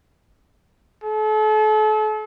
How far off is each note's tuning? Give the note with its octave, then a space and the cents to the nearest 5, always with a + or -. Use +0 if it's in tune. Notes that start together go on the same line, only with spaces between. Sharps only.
A4 -40